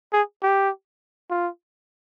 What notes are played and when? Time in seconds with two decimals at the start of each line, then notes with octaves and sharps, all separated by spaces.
0.13 G#4
0.43 G4
1.30 F4